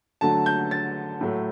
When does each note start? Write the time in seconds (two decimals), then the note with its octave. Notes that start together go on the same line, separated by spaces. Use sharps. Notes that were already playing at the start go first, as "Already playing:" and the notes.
0.21 D3 F#3 A3 A5
0.46 G6
0.71 A6
1.21 A2 F#3 A3